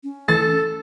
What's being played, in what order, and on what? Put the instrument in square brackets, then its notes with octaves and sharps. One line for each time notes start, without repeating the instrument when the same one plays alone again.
[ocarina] C#4
[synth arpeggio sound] E3 A3 [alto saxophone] A4 [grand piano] A6